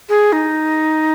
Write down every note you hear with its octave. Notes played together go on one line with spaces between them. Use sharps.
G#4
D#4